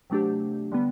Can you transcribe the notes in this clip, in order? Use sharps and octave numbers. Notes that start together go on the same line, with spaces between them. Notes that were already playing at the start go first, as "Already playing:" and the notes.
C3 F#3 A3 D4 G4
D3 G3 B3